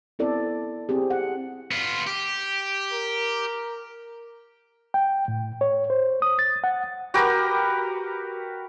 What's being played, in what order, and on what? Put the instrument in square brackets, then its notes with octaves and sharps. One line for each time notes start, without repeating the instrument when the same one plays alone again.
[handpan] B3 C4 E4 A4 D5
C4 G4 G#4
F#5
[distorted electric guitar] B3 F4
G4
[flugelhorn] A#4
[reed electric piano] G5
A2
C#5
C5
D#6
A6
F#5
[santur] F#4 G4 A#4 B4